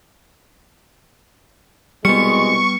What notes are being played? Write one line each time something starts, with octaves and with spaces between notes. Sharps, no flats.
C2 B2 G3 G#3 B3 C#6 C#7